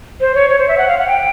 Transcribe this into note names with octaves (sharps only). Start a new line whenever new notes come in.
C5
C#5
C#5
C5
E5
F#5
F5
F#5
G5